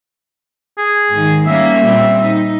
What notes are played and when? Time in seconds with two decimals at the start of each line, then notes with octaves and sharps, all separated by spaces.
0.78 G#4
1.09 G#2 D#3
1.47 G3 A#3 C#4 E5
1.84 A#2 G3 C4
2.21 D#4